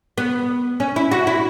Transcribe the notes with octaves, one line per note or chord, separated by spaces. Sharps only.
B3
C#4
E4
F#4
E4